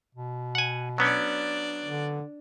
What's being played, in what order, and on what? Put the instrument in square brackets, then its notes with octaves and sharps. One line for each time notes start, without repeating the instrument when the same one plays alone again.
[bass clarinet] B2
[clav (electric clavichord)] F#5 G#5
[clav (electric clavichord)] F#3 B3 C#4 [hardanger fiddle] D4 D5
[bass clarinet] D3